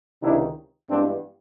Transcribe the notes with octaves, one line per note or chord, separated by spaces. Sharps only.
C#2 C3 D#3 D4 E4
G2 E3 G#3 B3 C4 D4